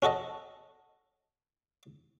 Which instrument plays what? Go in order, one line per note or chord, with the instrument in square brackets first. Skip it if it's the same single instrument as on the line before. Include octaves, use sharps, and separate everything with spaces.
[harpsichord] C#4 F#4 A4 D#5